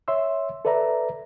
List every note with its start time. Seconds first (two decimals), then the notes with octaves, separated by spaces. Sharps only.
0.08 C#5 E5 C6 E6
0.65 A4 B4 D5 E5 A#5